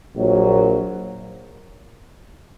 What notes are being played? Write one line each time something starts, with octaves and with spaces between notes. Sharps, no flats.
A#1 A#2 F#3